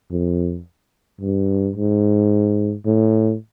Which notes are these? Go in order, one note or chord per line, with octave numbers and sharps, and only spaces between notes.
F2
G2
G#2
A2